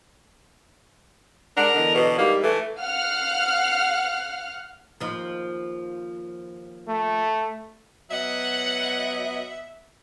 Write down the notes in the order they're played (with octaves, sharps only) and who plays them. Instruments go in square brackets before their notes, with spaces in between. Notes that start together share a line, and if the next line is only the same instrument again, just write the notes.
[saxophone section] G#3 D4 F#5 [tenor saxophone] A#4
[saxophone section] E2 D3 D#5
[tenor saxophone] B2
[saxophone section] G#2 G3 D#4 [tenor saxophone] A#3
[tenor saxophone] E3 [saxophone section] A3
[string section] F5 F#5 F6 F#6
[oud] D#2 F3
[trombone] A3
[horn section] F#3 B3 D#5 [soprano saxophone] E5 [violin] F#5